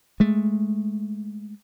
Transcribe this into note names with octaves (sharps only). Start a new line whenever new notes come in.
G#3 A3